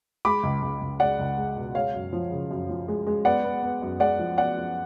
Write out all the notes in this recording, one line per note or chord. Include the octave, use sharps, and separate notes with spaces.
G#3 B5 D6
C#2
C#2
C#2
G#3 D5 F#5
C#2
G#3
B2
G#3 C#5 F5
F#2
F3
C#3
F#2
F3
G#3
G#3
B3 D5 F#5
B3
B3
F#2
G#3 D5 F#5
F3
B3 D5 F#5
F3